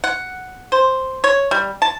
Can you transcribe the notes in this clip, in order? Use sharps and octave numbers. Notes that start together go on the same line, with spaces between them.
F#5
C5
C#5
G3
A5